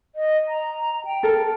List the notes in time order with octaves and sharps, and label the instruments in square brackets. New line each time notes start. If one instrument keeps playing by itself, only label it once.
[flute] D#5
A#5
G5
[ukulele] A4 A#4